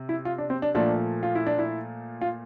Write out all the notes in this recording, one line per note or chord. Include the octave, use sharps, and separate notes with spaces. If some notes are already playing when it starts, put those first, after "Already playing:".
Already playing: C3
E4
F4
D4
C4
D4
A#2 F3 A3 D4
F4
E4
D4
E4
F4